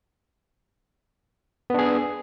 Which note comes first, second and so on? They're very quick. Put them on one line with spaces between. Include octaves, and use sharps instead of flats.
B3 D4 G#4